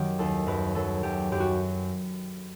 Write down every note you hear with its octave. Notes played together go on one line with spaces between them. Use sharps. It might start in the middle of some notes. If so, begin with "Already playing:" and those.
Already playing: F#2 D#3 F#3 G4
D#2 A4
F#2 B4
F#3 A4
F#2 G4
F#2 G4
F#4